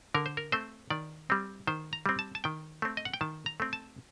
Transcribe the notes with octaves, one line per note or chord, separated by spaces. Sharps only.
D3 A#4
C5
A#4
A3 C4 C5
D#3 D5
G3 C4
D#3 C5
A#5
G3 C4
A5
A5
D#3 G5
A3 C4
D#5
F#5
G5
D#3 A5
A#5
A3 C4
A5